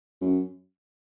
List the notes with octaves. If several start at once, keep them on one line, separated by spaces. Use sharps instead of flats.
F#2